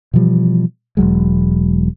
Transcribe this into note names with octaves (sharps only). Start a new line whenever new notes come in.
B2 E3 F3 G3
E1 F2 F#3 G#3